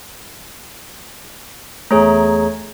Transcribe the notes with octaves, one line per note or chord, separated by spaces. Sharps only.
E2 A3 G#4 C#5 A#5